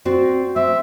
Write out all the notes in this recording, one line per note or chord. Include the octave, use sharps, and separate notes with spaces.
C4 F#4 D5
C4 E5